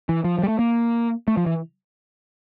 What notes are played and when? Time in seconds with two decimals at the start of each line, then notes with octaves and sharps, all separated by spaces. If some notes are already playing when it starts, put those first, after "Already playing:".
0.09 E3
0.24 F3
0.38 F3
0.43 G3
0.48 A3
0.59 A#3
1.28 A3
1.37 F3
1.46 E3